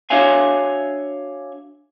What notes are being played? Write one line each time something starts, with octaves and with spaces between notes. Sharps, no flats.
D4 F#4 C#5 E5 F5 G#5